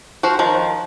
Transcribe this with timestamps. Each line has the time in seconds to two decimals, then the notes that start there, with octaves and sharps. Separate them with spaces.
0.23 F3 F#4 C5
0.39 D#3 F3